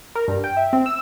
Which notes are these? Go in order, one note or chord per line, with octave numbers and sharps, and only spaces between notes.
A#4
G2
G5
E5
C4
E6